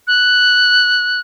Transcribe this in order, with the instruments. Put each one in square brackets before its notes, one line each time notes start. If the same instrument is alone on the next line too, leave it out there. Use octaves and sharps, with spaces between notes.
[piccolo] F#6